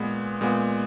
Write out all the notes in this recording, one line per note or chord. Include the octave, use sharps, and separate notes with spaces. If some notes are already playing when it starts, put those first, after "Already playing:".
Already playing: A#2 G#3 B3
A#2 G#3 B3